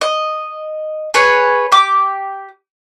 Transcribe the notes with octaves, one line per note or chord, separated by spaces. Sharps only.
D#5
G#4 B4 C#5
G4 D6